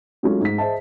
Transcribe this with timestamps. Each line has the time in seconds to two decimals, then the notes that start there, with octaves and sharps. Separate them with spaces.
0.23 F#3 G#3 A3 C#4 D#4 F4
0.41 G#2 B6
0.58 G#4 C5 D#5 E5 A5